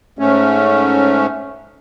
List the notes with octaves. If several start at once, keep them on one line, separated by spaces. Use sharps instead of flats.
G#2 A3 C#4